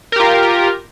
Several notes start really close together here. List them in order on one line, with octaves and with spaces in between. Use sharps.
A#4 G4 F4